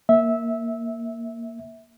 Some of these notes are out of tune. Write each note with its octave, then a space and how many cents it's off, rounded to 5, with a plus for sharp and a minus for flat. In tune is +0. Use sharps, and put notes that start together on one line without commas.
A#3 +0 E5 -15